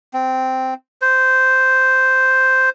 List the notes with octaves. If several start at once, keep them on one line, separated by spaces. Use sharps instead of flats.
C4
C5